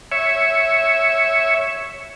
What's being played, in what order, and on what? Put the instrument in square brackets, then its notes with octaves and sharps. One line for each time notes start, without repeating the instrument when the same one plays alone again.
[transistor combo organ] C#5 E5